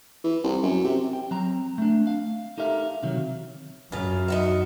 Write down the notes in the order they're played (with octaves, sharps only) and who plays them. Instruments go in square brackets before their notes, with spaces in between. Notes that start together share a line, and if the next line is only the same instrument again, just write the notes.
[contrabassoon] E3
C2
F#2
C3
[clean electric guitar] G5
F#3 C4 A#5
A3 D4
F5
D#4 G4 A4 A#4 E5 F5
C3 D#3 F#3
[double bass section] F#2 [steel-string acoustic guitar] C#3 F4
[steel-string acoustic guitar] D#4 F#4 E5